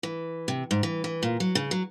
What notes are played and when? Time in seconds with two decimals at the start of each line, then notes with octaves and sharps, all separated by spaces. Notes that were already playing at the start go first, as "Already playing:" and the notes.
0.03 E3
0.48 C3
0.71 G#2
0.83 E3
1.04 E3
1.23 A#2
1.40 F#3
1.55 C#3
1.71 F#3